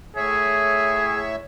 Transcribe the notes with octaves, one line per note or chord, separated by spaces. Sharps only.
A2 G#4 C#5 E5